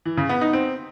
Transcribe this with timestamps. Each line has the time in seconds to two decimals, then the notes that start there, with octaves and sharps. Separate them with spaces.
0.06 E3
0.17 C#3
0.29 B3
0.41 D#4
0.53 C4